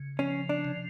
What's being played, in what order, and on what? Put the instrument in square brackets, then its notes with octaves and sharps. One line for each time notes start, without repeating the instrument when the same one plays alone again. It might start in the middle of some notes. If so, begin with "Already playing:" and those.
Already playing: [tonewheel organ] C#3
[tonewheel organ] F3 [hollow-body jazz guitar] C#4
[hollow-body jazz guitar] D4
[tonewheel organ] C3